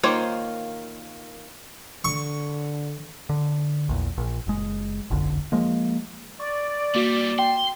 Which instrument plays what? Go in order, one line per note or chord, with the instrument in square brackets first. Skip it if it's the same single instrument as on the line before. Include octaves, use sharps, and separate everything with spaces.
[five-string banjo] D#3 A#3 F4 C5 C#5
[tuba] D3 [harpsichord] C#6
[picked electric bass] D3
A#1 E2
A#1
F#1 G#3
F#1 B1 F2 D3
F3 G#3 A#3
[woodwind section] D5 [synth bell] C#6
[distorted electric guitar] E3 G3 [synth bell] A#3 F#4 E7
[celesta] G5 [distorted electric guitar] C6